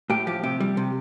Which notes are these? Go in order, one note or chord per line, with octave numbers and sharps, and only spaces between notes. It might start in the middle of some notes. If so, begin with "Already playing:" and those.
A2 G4
F3 G4
C3 G4
G3
C3